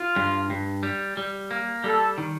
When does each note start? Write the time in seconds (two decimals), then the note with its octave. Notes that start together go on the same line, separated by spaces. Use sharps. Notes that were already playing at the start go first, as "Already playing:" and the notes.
Already playing: F4
0.16 G2
0.50 G2
0.83 G3
1.17 G3
1.51 A#3
1.84 G3 A4
2.18 D#3